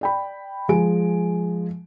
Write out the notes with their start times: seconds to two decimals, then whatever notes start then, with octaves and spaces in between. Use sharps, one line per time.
0.01 D5 G5 B5
0.69 F3 G#3 G#5 D7